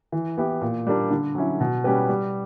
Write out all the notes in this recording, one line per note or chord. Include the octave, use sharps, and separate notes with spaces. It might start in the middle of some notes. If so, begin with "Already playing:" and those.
E3
B3 E4 G4
A#2
G3 A#3 D4
D3
F#3 C#4 E4
B2
G3 C#4 G4 B4
G3